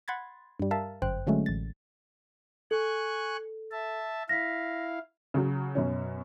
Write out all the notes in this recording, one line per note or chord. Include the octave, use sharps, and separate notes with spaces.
F#5 B5 C6 G#6 A6
G2 G3
A#4 E5 F5 A5
G1 F#2 C5 G5 F#6
D3 F#3 G#3 A3 C#4
A1 A6
A4 G#5 C#6 F#6
E5 A5
E4 F5 A#6 B6
C#3 F#3
F#2 B2 C#4